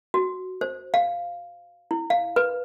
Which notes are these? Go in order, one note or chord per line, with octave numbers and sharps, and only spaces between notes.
F#4
C5
F5
E4
F5
B4